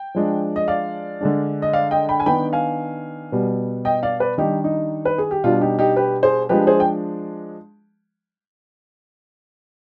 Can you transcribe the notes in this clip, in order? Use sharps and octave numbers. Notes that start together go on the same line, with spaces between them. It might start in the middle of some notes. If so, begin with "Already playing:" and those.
Already playing: G5
F3 G#3 D4
D#5
D5 F5
D3 G#3 D4
D#5
D5 F5
D#5 G5
G5 B5
G#5
D#3 B3 D4 G5 B5
F5 G#5
B2 G3 B3
D#5 G5
D5 F5
B4 D5
D#3 G3 D4 D#4 G4
D#4
B4
G#4
G4
B2 G3 D4 F4
D#4 G4
D#4 G4
G4 B4
G#4 C5
F3 G#3 D4 G4 B4
G#4 C5
G5